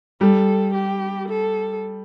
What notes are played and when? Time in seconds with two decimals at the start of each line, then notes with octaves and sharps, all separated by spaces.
0.21 G3 A4
0.74 G4
1.28 A4